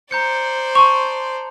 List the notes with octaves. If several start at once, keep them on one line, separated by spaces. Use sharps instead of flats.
C5 D5 A#5 G6 C#7
A5 C6 C#6 F7